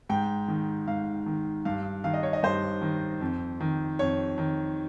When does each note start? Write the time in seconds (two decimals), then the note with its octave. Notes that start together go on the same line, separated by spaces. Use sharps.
0.09 G#2 G5
0.48 D#3
0.87 G#2 F5
1.26 D#3
1.65 G2 F5
2.04 D#3 F5
2.14 D#5
2.23 C#5
2.33 D#5
2.43 G2 C5
2.82 D#3
3.21 F2
3.60 D#3
3.99 F2 C#5
4.38 D#3